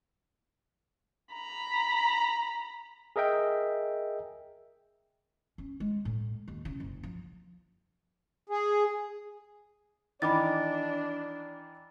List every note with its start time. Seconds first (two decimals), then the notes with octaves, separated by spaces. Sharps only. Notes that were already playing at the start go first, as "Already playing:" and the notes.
1.33 A#5 B5
3.16 G#4 A#4 D#5 E5 G5
5.58 C#4
5.80 G#3
6.05 A2
6.48 D#2
6.65 C#3
6.80 F#1
7.03 F3
8.49 G#4
10.22 D#3 E3 D4 D#4 B5 D6 A6